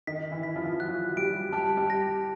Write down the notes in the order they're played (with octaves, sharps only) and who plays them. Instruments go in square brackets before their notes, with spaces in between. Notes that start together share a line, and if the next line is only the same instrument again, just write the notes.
[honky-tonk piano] D#3 D#4 [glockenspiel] B6
[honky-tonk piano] E3 E4
[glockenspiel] B6
[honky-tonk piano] F3 F4
[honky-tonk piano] F#3 F#4 [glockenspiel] F#6
[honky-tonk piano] G3 G4 [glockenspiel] D7
[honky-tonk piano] G3 G4 [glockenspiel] A5
[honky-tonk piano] G3 G4
[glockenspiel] A#6